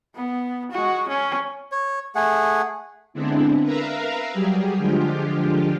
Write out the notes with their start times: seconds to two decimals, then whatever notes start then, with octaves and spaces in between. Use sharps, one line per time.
0.15 B3
0.71 G#3 F#4
1.08 C#4
1.72 C#5
2.15 A3 G#4 F#5
3.14 D3 G#3 B3 C4 D4 E4
3.63 A#4 B4 E5 F5 A#5
4.33 F#3 G3 G4 G#4
4.77 D3 F3 G#3 F4 G4